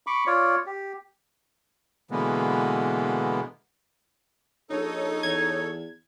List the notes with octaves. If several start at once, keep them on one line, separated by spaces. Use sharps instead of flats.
B5 C#6 D6
F4 C#5 D5
G4
B2 D3 E3 G#3 A#3 B3
A#1 D#4 A4 C#5
E2 G#6